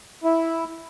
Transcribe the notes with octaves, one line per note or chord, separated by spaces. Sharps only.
E4